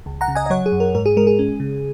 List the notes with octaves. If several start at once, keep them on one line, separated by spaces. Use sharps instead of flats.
C#2
F#5 A#5
C#3
D#5 G#5
D#5
F#3 C#5 F#5
G#4
F#2
A#4
G#2 A#4
G#4
G#3 A#4
G#4
C#4
C#3